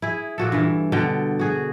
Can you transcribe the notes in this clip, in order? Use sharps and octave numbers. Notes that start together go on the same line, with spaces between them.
E4 G#4
A#2 F#4 A4
G2 E3
B2 D3 G5
F#4 G#4